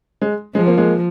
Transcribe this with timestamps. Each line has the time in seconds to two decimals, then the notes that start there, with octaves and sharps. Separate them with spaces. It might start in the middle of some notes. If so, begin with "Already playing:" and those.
0.22 G#3
0.55 F3 G#3
0.66 A#3 C4
0.77 G#3 A#3